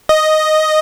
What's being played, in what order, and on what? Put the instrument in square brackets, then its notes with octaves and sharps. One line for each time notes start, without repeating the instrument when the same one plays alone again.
[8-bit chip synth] D#5